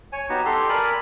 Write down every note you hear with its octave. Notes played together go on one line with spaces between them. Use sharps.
C#5 G#5
B3 D#4 F#4 G4
G4 A4 C6
A#4 D5 G#5 B5